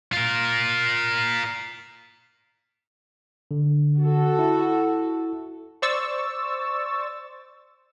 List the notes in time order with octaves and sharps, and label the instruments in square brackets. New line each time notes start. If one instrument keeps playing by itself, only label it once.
[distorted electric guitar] F4 A#4
[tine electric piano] D3
[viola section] F#4 A4
[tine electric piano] E4
[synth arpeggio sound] C5 D5 C#6 E6 A6